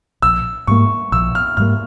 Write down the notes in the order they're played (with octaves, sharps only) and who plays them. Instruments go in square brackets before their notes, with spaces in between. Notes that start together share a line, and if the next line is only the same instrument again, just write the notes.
[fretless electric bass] A#1 [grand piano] E6
[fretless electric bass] G#2 G3 A#3 [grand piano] C#6
[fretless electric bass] A#1 [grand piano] E6
[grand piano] F6
[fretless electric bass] G#2 G3 A#3 [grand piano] F6